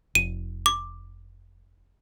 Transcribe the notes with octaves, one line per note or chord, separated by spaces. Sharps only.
F1 D#7
D6